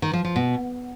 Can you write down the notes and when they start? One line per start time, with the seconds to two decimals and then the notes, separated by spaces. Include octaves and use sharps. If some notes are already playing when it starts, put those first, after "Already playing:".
0.02 D#3
0.13 F3
0.25 F3
0.36 B2